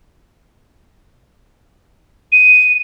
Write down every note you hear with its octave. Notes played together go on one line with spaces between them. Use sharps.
D#7